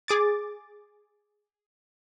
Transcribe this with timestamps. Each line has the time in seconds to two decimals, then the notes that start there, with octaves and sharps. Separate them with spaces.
0.08 G#4 D6 A6